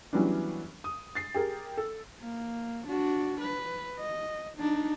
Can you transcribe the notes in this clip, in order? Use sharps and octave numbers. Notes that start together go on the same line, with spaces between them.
E3 F#3 G3 B3 C#4 D4
D#6
A6 C7
G4 G#4 A#4
A4
A#3
D4 F#4
B4
D#5
D4 D#4